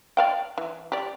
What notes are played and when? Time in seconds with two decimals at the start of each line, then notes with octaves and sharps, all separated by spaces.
0.17 D5 F5 G5
0.58 E3
0.92 G4 D5